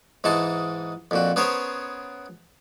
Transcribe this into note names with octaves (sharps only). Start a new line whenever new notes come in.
G#2 E3 G#3 D#4 A5
F2 A#2 F#4
B3 C#4 G#4 A#4 C5 C#5